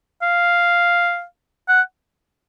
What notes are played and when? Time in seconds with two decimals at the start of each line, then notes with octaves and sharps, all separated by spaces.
0.22 F5
1.68 F#5